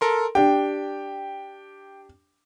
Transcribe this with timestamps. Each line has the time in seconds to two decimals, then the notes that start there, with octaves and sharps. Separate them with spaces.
0.01 A4 A#4 C6
0.35 D4 G4 G5